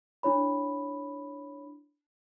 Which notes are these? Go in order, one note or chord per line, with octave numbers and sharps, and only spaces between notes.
D4 E4 C#5 B5